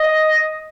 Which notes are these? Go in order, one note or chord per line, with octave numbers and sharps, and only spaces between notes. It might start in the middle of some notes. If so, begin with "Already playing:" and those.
Already playing: D#5